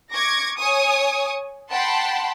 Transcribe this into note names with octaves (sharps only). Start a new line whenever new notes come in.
C#6 D6 G#6 A#6
C#5 G#5 C#6 D#6
F#5 G5 A5 B5 C6